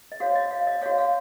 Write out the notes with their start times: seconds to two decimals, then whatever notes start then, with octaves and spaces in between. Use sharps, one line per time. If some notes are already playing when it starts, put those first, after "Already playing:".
0.12 D#5
0.20 F#4 C#5 F5
0.36 D#5
0.51 F5
0.67 D#5
0.82 F#4 C#5 F5
0.98 F5